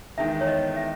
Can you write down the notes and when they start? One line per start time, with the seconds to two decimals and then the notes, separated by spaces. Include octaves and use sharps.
0.18 E2 D#3 G#3 E5
0.41 C#5
0.47 D#5
0.77 E5